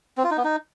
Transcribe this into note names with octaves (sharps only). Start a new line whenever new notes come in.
C4
F4
D#4
B3
D#4